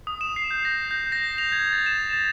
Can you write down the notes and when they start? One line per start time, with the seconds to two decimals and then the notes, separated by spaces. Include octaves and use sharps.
0.07 D#6
0.21 E7
0.36 C7
0.51 G6
0.65 A#6
0.91 G6
1.12 A#6
1.38 F7
1.52 G#6
1.73 A6
1.86 E7
2.13 A6